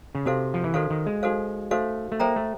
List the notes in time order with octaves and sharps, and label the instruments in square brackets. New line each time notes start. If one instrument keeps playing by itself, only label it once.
[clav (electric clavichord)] C#3
[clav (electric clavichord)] C3 [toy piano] D#4 F#4 A4 C5 F5
[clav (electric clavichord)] F3
E3
[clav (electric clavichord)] D#3 [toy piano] D#4 F#4 A4 C5 F5
[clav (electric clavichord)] D#3
G#3
[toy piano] D#4 F#4 A4 C5 F5
[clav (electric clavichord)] A3 [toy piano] D#4 F#4 A4 C5 F5
[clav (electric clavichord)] A3
[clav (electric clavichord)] A#3 [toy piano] A4 C5 E5 G5 A#5
[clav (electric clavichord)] A3